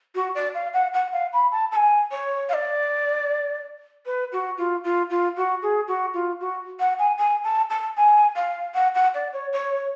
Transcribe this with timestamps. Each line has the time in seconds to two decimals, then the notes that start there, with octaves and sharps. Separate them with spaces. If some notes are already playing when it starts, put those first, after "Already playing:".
0.15 F#4
0.35 D5
0.54 F5
0.74 F#5
0.93 F#5
1.13 F5
1.33 B5
1.52 A5
1.72 A5
1.76 G#5
2.11 C#5
2.49 F5
2.54 D5
4.06 B4
4.32 F#4
4.58 F4
4.84 F4
5.10 F4
5.37 F#4
5.62 G#4
5.88 F#4
6.14 F4
6.40 F#4
6.80 F#5
6.99 G#5
7.18 G#5
7.44 A5
7.70 A5
7.97 G#5
8.36 F5
8.74 F#5
8.95 F#5
9.14 D5
9.33 C#5
9.53 C#5